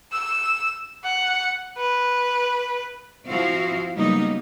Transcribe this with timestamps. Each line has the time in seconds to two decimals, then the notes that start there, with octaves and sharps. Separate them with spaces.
0.12 E6
1.04 F#5
1.78 B4
3.28 F3 C4 E4 F#4 F5
3.95 C#3 F#3 G3 A#3 B3 D#4